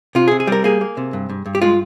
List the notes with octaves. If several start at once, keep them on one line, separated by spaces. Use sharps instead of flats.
C3 F4
G#4
C3
G#4
G3 A#4
A#3 G#4
A#3
C3
G2
G2
G2
G4
G#3 F4